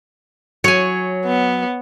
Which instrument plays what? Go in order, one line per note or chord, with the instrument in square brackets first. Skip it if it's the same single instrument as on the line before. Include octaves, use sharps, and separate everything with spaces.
[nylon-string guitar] F#3 [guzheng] C#5 G#5
[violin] B3